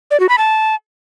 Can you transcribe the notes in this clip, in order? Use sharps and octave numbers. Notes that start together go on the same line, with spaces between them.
D5
F#4
B5
A5